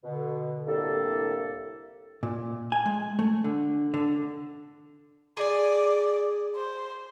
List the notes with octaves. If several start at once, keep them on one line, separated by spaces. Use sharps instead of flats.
B2 D3
C2 A2 D3 A#3 G4 A4
A#2
G#5
G#3
A3
D3
D3
G#4 D5 G#5
C5